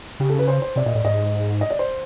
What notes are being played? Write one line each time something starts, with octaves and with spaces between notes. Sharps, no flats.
C#3 G4
A4
B4
C5
C5
C3 D5
A#2 D#5
A2 D5
G#2 D#5
D#5
D5
C5